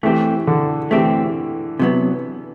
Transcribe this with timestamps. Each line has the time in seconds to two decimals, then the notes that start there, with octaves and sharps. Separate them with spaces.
0.03 E3 A3 C4 G4
0.47 D3
0.91 E3 A3 C4 G4
1.79 C3 F#3 B3